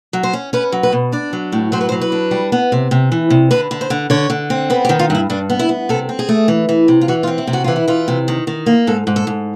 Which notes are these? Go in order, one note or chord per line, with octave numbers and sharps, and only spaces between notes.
F#3
C5
C#4
C#4 B4
F#3
B4
B2
D4 D5
F#3
A2
F#3 C5
B4
C5
F#3
B4
D4
G3
B3
C3
C3
E3
C3
D3 B4
D3
C5
D3
D3 C#5
D3
C4
B3 B4
G4
D#3
F4
G2 E4
G2 D4
B3
E4
B3
C3 A4
C4
G#4
A3
E3
E3
C3
F4
E3 F#4
F4
C4
E4
C3
F#4
E3 F4
E4
E3 F4
C3
D#3
D#3
A#3
G#2 A4
G#2
A4
G#2